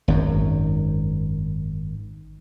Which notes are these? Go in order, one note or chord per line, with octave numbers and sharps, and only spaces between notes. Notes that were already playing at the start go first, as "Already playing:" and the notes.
G#1 F#2